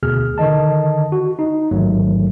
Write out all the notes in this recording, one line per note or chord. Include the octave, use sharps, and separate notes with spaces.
D2 B2 G#4 F6
D3 D#3 D#5 A5
F#4
D#4
A1 G#2 D#3 F#3 A3